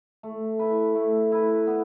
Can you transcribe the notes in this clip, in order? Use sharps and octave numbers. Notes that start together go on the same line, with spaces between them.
A3
E4 B4
A3
E4 B4
B3